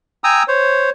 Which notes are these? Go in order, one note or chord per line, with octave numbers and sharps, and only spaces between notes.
G5 G#5 A#5 D#6 E6
C5 C#5